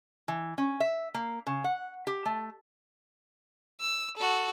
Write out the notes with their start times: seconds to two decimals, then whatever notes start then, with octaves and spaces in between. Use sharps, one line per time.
0.28 E3
0.58 C#4
0.80 E5
1.14 A#3
1.47 C#3
1.64 F#5
2.07 G4
2.25 A3
3.81 E6
4.17 F#4 A4